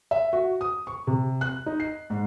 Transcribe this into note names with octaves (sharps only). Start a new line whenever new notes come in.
E5
F#4
D#6
C#6
C3
F#6
D#4
C7
G#2